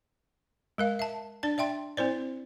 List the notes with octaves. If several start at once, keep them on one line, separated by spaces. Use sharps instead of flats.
G#3 A#4 F5
E5 A5
D4 D5 A5
D5 E5 G5 C6
C4 E4 C5 D5